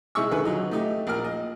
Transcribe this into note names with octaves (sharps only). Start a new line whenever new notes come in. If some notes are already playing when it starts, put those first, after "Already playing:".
C3 G#3 D#4 E4 C#6 E6
D3 D#3 G#4 B4
F#3 D#4 F4
A3 D#4 G4
A#1 A#4 F6
D#5